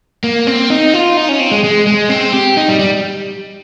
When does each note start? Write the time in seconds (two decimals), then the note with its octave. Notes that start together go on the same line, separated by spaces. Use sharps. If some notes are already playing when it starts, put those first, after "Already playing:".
0.24 A#3
0.47 C4
0.70 D#4
0.94 F4
1.17 D#4
1.29 C#4
1.40 C4
1.52 G#3
1.64 G#3
1.87 G#3
2.09 C4
2.33 G4
2.57 D#4
2.68 G3
2.79 G3